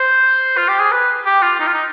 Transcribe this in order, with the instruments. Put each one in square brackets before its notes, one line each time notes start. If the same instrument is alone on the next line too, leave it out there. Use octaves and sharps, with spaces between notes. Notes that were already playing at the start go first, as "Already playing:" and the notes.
Already playing: [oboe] C5
F4
G4
G#4
B4
G4
F4
D#4
F4
D#4